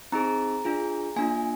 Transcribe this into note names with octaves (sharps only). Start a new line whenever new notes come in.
C4 D#4 G#4 A#5
D4 F4 G#4
A#3 D4 F4 G#5